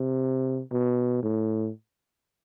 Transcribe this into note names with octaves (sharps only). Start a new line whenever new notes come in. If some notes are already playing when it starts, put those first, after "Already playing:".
Already playing: C3
B2
A2